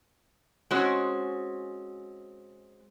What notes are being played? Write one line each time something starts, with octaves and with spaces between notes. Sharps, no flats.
G#3 C4 C#4 F#4